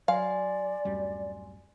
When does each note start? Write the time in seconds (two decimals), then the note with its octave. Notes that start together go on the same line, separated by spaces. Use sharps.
0.08 F#3 D5 F5 G#5 C6
0.85 D1 F#2 G3